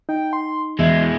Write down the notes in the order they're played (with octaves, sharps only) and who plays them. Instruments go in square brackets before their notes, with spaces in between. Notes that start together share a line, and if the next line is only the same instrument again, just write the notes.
[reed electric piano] D#4 [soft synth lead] G5
[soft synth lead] C6
[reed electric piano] E2 [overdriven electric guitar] B2 G#3 [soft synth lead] E5